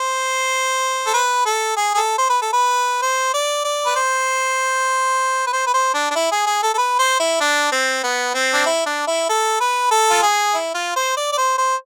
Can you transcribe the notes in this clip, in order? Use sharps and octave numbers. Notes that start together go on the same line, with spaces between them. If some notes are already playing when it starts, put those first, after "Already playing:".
Already playing: C5
A4
B4
A4
G#4
G#4
A4
C5
B4
A4
B4
C5
D5
D5
B4
C5
B4
C5
B4
C5
D4
D4
E4
G#4
G#4
A4
A4
B4
C5
E4
D4
C4
B3
C4
D4
E4
D4
E4
A4
B4
A4
F4
G#4
E4
F4
C5
D5
D5
C5
C5